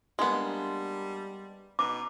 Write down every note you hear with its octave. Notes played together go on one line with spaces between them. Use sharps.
G3 G#3 A#3 B3 D4
B2 D#4 D6